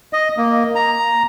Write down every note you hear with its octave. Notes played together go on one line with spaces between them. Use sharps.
D#5
A#3
A#5